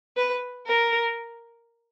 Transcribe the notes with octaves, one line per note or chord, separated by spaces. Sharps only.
B4
A#4